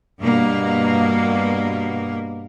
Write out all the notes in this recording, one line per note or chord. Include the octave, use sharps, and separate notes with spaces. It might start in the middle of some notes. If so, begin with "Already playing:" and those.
G2 B2 A#3